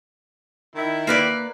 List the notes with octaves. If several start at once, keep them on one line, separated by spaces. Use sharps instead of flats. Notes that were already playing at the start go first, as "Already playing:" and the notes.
D#3 E4
A#3 B4 D5